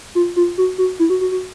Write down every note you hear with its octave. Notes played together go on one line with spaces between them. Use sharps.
F4
F4
F#4
F#4
E4
F#4
F#4
F#4